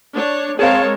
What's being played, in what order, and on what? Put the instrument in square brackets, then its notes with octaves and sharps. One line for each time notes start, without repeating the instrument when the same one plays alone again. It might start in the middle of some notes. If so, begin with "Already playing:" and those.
[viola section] D4 C#5
[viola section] G#3 A#4 [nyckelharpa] C4 A5 [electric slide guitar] G#4 F5 [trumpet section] C#5